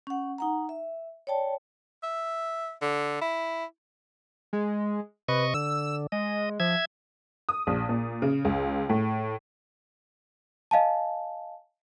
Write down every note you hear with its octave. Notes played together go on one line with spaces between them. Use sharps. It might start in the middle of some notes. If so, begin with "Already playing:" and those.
C#4 F#5
D#4 F#5 A#5
E5
C#5 D5 G5 A5
E5
D3
E4
G#3
C3 B4 D#5 C#6
D3 E6
G#3 D#5
F3 E5 G#6
D#6
A#1
A#2
C#3
C#2
A2
D#5 F5 G#5 A5